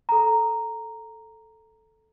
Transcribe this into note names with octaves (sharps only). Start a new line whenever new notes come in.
A4 A#5